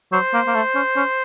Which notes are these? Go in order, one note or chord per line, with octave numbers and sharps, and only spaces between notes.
F#3 C5
A#3
A#3
A3
C#4
C#4